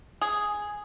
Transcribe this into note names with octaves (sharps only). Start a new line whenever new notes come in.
G#4